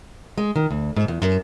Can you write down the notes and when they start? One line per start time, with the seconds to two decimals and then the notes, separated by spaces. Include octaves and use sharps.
0.38 G#3
0.56 D#3
0.71 D2
0.96 G#2
1.08 E2
1.22 F#2